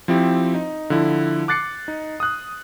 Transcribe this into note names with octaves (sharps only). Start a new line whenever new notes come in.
F3 C4 E4 G4
D#4
D3 F3 E4
D6 F#6 A6 C7 C#7
D#4
D#6 F#6